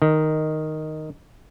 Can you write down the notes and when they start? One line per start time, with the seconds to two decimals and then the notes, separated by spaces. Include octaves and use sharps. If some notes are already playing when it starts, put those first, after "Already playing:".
0.02 D#3